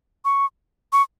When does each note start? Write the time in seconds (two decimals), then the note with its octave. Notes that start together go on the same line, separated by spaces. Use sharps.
0.25 C#6
0.93 C#6